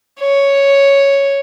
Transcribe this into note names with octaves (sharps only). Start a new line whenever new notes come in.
C#5